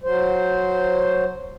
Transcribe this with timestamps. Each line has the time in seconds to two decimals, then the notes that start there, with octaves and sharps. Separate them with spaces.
0.04 F#3 C5